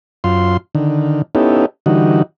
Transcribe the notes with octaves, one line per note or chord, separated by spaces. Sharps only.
F#2 F4 C6
D3 D#3
B3 C#4 D#4 E4 G4 A4
D3 E3 G3 D#4 F#4